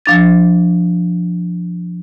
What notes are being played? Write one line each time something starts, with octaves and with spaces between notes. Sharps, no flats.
F3 D4 A6